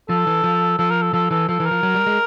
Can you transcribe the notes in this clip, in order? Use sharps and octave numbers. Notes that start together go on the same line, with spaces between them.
F3 A4
E3
F3
F3 A4
A#4
A4
F3 A4
E3 A4
F3 A4
E3
A#4
F3
F#3
G3
G#3